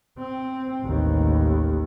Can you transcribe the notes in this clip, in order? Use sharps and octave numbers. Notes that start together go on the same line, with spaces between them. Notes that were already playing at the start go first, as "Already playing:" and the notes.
C4
A1 D#2